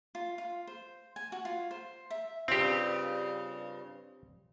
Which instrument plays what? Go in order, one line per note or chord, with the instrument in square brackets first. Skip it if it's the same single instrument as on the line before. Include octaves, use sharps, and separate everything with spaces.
[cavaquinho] F4
F4
C5
G#5
F#4
F4
C5
E5
[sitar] G2 C#3 F4 [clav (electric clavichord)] C4 G4